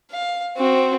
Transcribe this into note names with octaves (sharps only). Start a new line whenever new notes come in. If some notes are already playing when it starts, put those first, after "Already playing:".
F5
C4 F#4